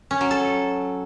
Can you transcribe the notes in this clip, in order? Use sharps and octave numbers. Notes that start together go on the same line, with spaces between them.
C#4
F#3
A4